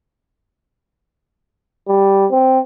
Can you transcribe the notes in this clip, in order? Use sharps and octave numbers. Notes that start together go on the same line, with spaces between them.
G3
C4